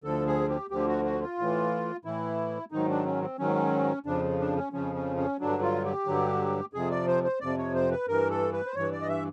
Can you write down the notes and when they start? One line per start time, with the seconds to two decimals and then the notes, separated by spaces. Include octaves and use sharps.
0.04 D2 D3 F3 A4
0.27 G#4
0.49 G4
0.70 D2 D3 F3 G4
0.88 F#4
1.05 F#4
1.21 F4
1.39 A2 E3
2.05 A2 E3 E4
2.71 G#2 D#3 F#3 D#4
2.89 D4
3.05 C#4
3.22 C4
3.39 G#2 D#3 F#3 C#4
4.06 F2 C#3 F3 D4
4.39 D4
4.56 C#4
4.73 F2 C#3 F3 C#4
4.95 C#4
5.17 C#4
5.39 G2 D3 F#3 D4
5.62 F4
5.85 G4
6.06 G2 D3 F#3
6.73 F2 C3 F3 G#4
6.91 D5
7.07 C5
7.24 C5
7.40 F2 C3 F3 D5
7.58 C#5
7.75 C5
7.91 B4
8.07 G2 E3 A#4
8.30 A4
8.52 B4
8.66 C5
8.75 G2 E3 C#5
8.92 D5
9.01 D#5
9.09 E5